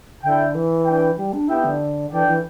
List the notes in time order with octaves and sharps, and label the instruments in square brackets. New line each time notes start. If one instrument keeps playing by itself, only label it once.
[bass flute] D3 [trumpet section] E4 A4 E5 G5
[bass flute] E3
[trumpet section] D4 B4 G5
[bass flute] G3
D4
[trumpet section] B3 G4 E5 G5 [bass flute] E4
[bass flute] D3
[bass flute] E3 [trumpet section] D4 A4 D5 G5
[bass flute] E3